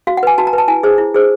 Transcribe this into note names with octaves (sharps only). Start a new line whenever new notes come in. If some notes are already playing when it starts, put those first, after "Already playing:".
F#4 F5
F#5
B4 G#5
F#4 A5
A#5
B4 A5
E4 G#5
G#4 C5
E4
G#4 C5